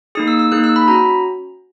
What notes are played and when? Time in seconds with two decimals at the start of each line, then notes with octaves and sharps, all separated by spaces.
0.15 A#3 D#4 G#4 D#6
0.28 E6
0.39 E6
0.52 A#3 D#4 G#4 F#6
0.64 E6
0.76 B5
0.88 C#4 F#4 A#5